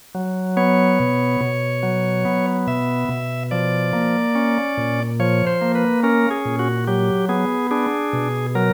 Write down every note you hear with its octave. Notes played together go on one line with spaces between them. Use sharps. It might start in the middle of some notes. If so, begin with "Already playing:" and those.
F#3
B3 C#5
B2
B2
F#3
B3
B2 E5
B2
F3 D5
A#3
C#4
A#2
F3 C#5
C5
A#3
B4
C#4 A#4
G#4
A#2
F#4
F#3 G4
B3 G#4
D4 G#4
B2
F#3 A#4